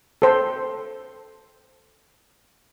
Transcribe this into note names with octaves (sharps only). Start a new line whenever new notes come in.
A4 C5